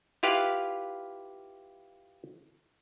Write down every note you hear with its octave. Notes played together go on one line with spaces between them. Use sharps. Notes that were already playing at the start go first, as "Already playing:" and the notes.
E4 F4 G4 B4 F5